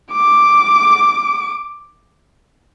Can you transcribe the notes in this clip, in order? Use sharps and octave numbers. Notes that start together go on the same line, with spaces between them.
D6